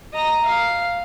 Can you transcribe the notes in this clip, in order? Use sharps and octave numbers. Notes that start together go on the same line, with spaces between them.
D#5 A#5
F5